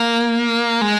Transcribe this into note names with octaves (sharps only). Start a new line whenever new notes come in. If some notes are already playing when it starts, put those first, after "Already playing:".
Already playing: A#3
G#3